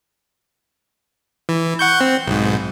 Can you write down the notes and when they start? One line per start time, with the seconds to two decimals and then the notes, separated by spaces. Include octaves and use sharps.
1.49 E3
1.79 F#5 C#6 G6
2.01 C4
2.27 B1 G#2